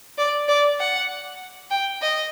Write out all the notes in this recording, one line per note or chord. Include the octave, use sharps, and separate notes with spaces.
D5
D5
F#5
G5
D#5